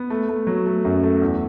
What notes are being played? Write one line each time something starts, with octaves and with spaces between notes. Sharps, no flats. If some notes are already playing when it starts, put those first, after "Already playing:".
Already playing: B3
A3
A3
F#3
A3
F#2
A3
E2